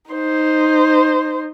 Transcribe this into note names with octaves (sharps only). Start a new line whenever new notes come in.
D#4 C5